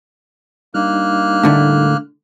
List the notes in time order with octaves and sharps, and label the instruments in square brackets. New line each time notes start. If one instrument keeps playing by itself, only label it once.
[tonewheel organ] G3 D4 D#4 [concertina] A#3 F6 F#6
[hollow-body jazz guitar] A2 D3 A3